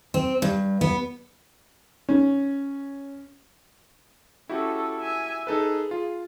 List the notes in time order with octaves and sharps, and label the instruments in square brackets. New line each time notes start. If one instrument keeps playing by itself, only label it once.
[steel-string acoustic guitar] C4
G2
B3
[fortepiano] C#4
[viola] C#4 A4 [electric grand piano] E4 F#4 G4
[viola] E5 G#5
[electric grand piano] D#4 A4 B4 [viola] G#4
[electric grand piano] F4